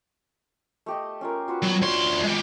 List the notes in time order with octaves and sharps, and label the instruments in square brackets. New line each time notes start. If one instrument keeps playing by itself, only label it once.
[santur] A3 G4 D#5
C#4 F4 A#4
F4 F#4 B4
[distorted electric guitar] F#3 [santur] B3
[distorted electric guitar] D2 C6 [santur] C#5 F5
[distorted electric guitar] G#3 G4 [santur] B5